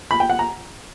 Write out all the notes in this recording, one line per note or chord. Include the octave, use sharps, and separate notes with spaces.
B5
G5
F#5
A#5